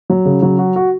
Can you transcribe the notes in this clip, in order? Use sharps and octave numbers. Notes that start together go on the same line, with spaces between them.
F#3
C#3
F#3
F#4
F#4